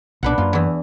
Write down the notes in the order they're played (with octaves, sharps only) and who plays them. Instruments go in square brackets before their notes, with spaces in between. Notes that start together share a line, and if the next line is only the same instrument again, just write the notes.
[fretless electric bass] B1 A#2 [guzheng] D4 B4 F#5
[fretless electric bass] F#2 A#3 [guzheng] F4
[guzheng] E2 E3